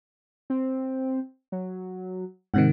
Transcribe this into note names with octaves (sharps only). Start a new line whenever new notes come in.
C4
F#3
G#2 C3 D#3 F#5